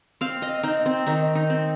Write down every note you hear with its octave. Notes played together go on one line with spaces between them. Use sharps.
C4 F5
D#5
C4 D#4
C4
D#3 D#4
D#4
C4